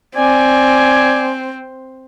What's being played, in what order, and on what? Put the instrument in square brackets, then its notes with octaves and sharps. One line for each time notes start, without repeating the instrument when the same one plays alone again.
[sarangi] C4 [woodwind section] D5 G#5